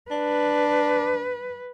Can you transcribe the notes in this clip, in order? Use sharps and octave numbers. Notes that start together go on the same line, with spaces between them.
D4 B4